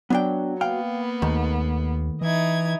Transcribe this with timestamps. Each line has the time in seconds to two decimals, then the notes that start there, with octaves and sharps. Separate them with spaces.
0.10 F#3 B3 D4 G5
0.61 A#3 B3 F5 G5
1.22 D#2 D#3 A3
2.21 E3 D#4 E4 G#6